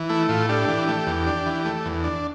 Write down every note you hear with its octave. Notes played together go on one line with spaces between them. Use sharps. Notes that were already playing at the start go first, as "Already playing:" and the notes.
Already playing: E3
A3 E4
A2 F4
D4 G4
E3
A3
E2
D4
E3
A3
E2
D4